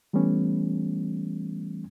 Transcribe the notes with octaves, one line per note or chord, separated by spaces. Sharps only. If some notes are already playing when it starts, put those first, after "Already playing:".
E3 G3 A3 B3 C#4